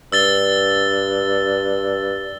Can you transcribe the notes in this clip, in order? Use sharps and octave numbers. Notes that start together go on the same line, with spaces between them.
G2 E6 A6 G7